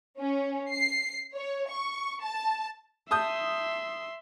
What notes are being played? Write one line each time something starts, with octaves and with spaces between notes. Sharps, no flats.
C#4
C7
C#5
C#6
A5
E5 A5 C6 D#6 G6